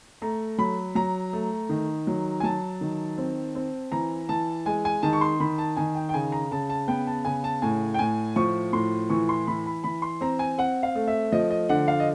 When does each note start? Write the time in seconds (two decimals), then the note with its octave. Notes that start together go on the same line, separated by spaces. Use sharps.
0.22 A3 A#5
0.58 F#3 B5
0.95 F#3 A#5
1.33 A3
1.69 D#3
2.07 F#3
2.40 G#5
2.43 F#3 A5
2.81 D#3
3.18 C4
3.55 C4
3.92 E3 A#5
4.29 E3 A5
4.66 G#3 G#5
4.85 G#5
5.03 D#3 A5
5.13 C#6
5.21 C6
5.40 D#3 B5
5.58 A5
5.77 D#3 G#5
5.95 G5
6.09 G5
6.14 C#3 G#5
6.32 A#5
6.51 C#3 A5
6.69 A5
6.88 B3 G5
7.07 A5
7.25 C#3 G#5
7.44 A5
7.62 A2 G#5
7.94 G5
7.99 A2 G#5
8.36 F3 C#6
8.73 A2 C6
9.10 E3 C#6
9.29 C6
9.47 E3 B5
9.66 B5
9.84 E3 B5
10.02 C6
10.21 C4 A#5
10.39 G#5
10.58 C4 F#5
10.83 F5
10.95 A3
11.08 E5
11.32 F3 D#5
11.50 D#5
11.69 D3 F#5
11.88 F5
12.00 D#5